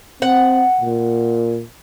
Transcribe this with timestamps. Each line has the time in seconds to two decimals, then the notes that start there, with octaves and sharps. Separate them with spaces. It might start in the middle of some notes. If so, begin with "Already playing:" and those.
0.22 C4 F#5
0.81 A#2